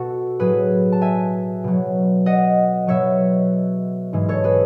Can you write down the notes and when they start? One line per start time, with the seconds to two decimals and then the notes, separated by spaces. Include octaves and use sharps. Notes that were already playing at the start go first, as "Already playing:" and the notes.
Already playing: B2 F#4 A4
0.40 A2 F#3 G#4 B4
0.92 A5
1.01 E5 G#5
1.64 B2 F#3
2.26 D#5 F#5
2.87 B2 F#3 C#5 E5
4.13 G#2 E3 G#3
4.28 A4 C#5
4.44 G#4 B4